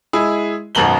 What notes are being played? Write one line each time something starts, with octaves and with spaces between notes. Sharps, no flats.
G#3 E4 G#4
G#1 F#2 B2 A#5 F#7 G7